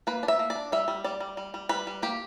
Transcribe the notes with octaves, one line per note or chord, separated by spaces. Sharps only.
A#3 B4
D4
E5
A#3
D5
D4
G3 E5
G3
G3 D5
G3
G3
G3
G3 B4
G3
A#3 G4